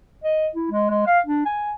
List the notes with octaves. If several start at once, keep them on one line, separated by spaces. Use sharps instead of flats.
D#5
E4
G#3
G#3
F5
D4
G#5